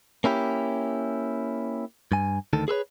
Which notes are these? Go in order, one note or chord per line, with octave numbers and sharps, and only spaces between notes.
A#3 C#4 E4 G4
G2 G#5
D2 D#3 A4
G#4 A4 B4 C#5